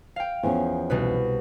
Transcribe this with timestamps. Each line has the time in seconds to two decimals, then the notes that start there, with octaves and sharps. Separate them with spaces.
0.16 F5 G5
0.43 E2 F3 C#4
0.90 C2 B2 B4